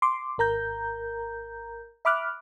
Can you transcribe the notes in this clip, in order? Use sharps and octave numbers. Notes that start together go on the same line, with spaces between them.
C6 D6
G#1 A#4 A#5 G6
E5 B5 D6 F6 F#6